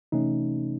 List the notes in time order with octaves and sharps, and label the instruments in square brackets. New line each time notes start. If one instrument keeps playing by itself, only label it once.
[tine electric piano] C3 E3 A3 C#4 D#4